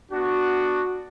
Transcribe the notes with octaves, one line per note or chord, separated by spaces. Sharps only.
B3 D4 F#4